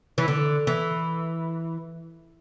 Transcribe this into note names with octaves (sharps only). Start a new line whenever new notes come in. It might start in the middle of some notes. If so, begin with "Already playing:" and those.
E3
D3
E3